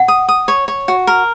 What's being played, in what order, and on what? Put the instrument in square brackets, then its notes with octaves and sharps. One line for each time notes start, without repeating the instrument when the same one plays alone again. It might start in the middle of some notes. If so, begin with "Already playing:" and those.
Already playing: [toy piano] F#5
[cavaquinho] D#6
D#6
C#5
C#5
F#4
A#4